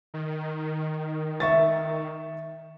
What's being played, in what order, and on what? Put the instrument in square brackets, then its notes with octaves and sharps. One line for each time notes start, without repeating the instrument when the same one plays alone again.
[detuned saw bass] D#3
[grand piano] E5 C#6 A6